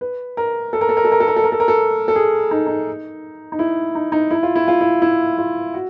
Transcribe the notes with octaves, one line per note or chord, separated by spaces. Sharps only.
B4
A#4
A4
A#4
A4
A#4
A4
A#4
A4
A#4
A4
A#4
A4
A#4
A4
A4
G#4
D#4
D#4
D#4
E4
D#4
D#4
E4
F4
E4
F4
E4
E4
F4
F#4